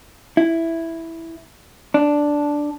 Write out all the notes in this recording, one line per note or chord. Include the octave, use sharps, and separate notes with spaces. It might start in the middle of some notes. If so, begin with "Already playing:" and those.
E4
D4